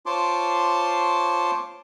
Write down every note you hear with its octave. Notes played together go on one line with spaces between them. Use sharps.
F4 C5 C#5 A5 C6 D6